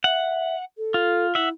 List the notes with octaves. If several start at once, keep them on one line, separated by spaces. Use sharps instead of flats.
E5 F#5
A4
F4
E4 E5 F#5